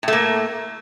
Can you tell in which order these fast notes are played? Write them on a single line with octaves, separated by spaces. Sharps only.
A2 A3 A#3